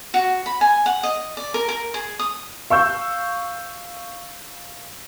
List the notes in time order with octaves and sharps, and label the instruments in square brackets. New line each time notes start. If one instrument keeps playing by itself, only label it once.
[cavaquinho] F#4
B5
G#5
F#5
D#5
D5
A#4
A#4
G#4
D#6
[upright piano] F5 C#6 E6 G6